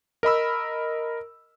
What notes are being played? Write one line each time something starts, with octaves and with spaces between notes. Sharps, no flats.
A#4 D#5 B5 E6